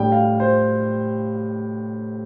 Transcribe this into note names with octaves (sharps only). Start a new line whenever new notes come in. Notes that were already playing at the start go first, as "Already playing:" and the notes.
Already playing: A2 G3 D4 G5
F5
C5